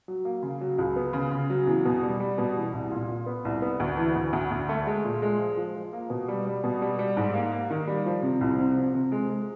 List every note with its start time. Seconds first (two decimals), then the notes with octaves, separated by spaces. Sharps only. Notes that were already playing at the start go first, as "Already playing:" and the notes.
0.08 F#3
0.25 A#3
0.42 C#3
0.61 F#3
0.78 C#2
0.96 B3
1.13 C#3
1.31 C#3
1.50 F#3
1.67 E2
1.85 B2
2.03 G3
2.20 G3
2.38 B2
2.56 E2
2.73 C2
2.91 A#2
3.09 A#2
3.26 B3
3.45 C2
3.62 B3
3.80 D2
3.97 E3
4.16 D2
4.33 D2
4.51 D2
4.69 A3
4.87 G#3
5.05 A#2
5.22 G#3
5.39 F3
5.57 F3
5.75 F3
5.93 A#3
6.10 B2
6.28 G3
6.46 G3
6.64 B2
6.82 G3
6.99 G3
7.17 G#2
7.34 A#3
7.52 A#3
7.70 D#3
7.87 G3
8.06 F3
8.23 C3
8.41 C2
8.58 C3
8.77 F3
8.94 C3
9.12 G#3
9.29 G#3